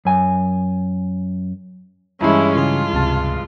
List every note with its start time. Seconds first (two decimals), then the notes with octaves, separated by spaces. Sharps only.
0.05 F#2 G#5
2.21 G2 E3 G#3 C#4 E4
2.56 C#3 F4 G#4
2.94 C#2 C3 A5